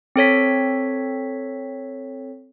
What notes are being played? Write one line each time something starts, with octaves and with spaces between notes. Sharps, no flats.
C4 A4 C#5 B6